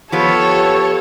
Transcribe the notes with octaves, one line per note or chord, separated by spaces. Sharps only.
F3 B3 G4 A4 C#5